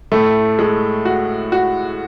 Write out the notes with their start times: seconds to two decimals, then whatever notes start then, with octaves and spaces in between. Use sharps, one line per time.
0.12 A2 A3
0.59 G#3
1.05 F#4
1.52 F#4